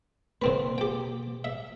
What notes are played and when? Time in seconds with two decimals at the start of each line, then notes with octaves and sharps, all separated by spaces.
0.42 B2 D3 A#3 C4 B4
0.78 G4 G5
1.44 E5